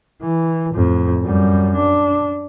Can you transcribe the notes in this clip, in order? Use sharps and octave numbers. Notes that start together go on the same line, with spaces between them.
E3
F2 A2
F#2 G3
D4